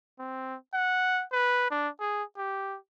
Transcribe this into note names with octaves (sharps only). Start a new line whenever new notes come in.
C4
F#5
B4
D4
G#4
G4